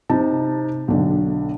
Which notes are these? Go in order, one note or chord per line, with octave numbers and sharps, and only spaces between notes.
C3 D#4 A5
B1 D3